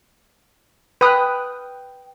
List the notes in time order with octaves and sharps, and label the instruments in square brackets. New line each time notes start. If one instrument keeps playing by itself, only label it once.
[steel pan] B4 D#6 [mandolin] G5 F6 F#6